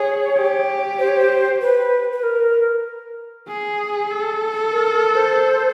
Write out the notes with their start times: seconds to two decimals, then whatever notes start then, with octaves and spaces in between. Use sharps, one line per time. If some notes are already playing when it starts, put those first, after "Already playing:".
Already playing: G#4 C#5
0.37 G4
0.99 C5
1.08 C#5
1.16 C5
1.62 B4
2.12 B4
2.23 A#4
3.48 G#4
4.10 A4
4.72 A#4
4.93 A#4
5.14 C5